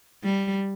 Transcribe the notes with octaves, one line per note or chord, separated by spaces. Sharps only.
G3